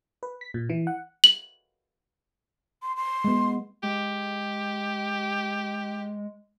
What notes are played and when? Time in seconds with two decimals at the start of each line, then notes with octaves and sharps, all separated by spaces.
0.23 B4
0.41 B6
0.54 A#2
0.70 E3
0.87 F#5
1.24 F#7
2.82 C6
2.97 C6
3.24 G#3 B3
3.83 G#3 G4